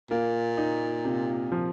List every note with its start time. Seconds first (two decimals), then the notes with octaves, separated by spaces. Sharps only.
0.10 A#2 A#3
0.57 D#4
1.05 C3
1.52 F3